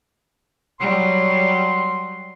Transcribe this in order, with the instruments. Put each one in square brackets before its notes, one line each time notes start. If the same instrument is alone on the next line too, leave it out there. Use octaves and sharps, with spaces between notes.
[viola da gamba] F#3 G3 [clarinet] C6